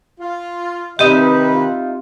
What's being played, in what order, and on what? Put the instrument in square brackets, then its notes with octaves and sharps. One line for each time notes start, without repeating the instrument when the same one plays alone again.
[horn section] F4
[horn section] C3 D#3 B4 [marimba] C4 G4 [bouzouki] D#4 E5 [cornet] D#5
[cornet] F4